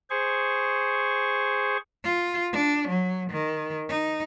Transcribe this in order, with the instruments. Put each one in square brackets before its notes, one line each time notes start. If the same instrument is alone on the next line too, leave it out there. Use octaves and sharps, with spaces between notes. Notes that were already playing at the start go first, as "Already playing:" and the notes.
[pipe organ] G#4 C5 C#6
[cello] F4
D4
F#3
D#3
D#4